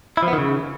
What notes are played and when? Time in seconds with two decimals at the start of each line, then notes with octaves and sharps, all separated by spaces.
0.17 E4
0.23 F3
0.28 B3
0.33 D#3
0.38 C#3